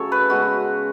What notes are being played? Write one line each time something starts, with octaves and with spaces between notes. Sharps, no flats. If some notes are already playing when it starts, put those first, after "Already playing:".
Already playing: C#3 F#3 A3 A4 C#5
B4
C#3 G#3 B3 F#4